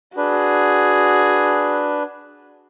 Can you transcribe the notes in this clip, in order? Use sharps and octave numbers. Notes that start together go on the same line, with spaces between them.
D4 F#4 G#4 B4